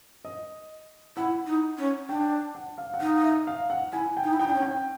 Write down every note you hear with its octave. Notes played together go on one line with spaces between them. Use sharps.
D#5
E4 F#5
D#4
C#4
D4 G5
F#5
F5
F#5
D#4 F5
E5
F5
F#5
E4 G#5
G5
D#4
E4
D#4 G5
D4
C#4
G5